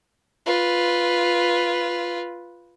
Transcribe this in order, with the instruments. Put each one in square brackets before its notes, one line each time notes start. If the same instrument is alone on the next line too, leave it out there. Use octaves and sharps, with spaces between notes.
[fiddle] F4 B4